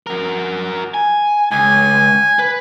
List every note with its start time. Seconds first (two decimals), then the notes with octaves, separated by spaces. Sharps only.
0.07 F#4 A#4
0.94 G#5
1.51 C#2 G#5
2.39 B4